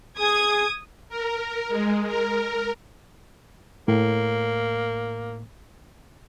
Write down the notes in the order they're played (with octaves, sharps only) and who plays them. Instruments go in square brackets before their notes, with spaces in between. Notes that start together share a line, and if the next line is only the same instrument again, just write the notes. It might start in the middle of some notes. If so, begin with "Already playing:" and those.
[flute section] G#4 [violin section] D#6 G#6
[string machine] A#4
G#3
A#4
[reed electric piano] A2 [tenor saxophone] A#3